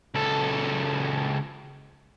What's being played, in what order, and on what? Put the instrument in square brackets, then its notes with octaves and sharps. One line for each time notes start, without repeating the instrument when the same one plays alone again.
[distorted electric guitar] C#2 A4